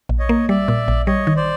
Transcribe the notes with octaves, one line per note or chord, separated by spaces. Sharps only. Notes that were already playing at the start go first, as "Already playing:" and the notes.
A#1
C#5 D#5
A#3
G3 D5 E5
A#2
A#1
G3 C#5 D#5
D#3
C5 D5